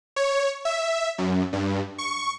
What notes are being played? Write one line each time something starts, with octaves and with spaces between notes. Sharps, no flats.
C#5
E5
F#2
G2
C#6